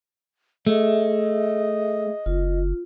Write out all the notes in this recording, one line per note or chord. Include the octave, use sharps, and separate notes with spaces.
A3 G#4 D#5 E5
F#1 F4